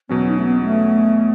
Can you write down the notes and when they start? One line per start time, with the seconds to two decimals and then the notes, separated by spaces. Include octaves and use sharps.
0.09 E2 B2 F#3 B3 C#4
0.27 D#4
0.39 A3
0.45 B3
0.62 A3